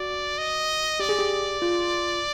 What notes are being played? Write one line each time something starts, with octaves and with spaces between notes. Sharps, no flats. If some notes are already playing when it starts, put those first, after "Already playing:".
Already playing: F#4 D5
D#5
G4 D5
G#4
G4
F4